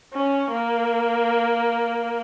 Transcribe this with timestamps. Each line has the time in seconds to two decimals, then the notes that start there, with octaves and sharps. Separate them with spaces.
0.13 C#4
0.52 A#3